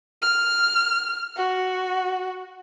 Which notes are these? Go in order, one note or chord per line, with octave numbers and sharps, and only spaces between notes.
F6
F#4